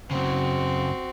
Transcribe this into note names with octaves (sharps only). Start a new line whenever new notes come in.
F#2 C#3 C4 F#4